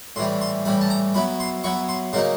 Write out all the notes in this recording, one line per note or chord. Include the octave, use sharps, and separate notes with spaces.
A2 E3 G3 C6
C6
A2 E3 G3 B5
A5
A#5
F#3 B3 E4 B5
C6
F#3 B3 E4 C#6
C6
C#3 F#3 A#3 D#4 C6